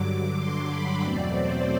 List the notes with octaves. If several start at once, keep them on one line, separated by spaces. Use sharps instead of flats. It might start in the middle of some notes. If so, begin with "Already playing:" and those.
Already playing: G2 D3 F#3 D6
C6
B5
E2 B2 F#3 A3 C4 D5
C5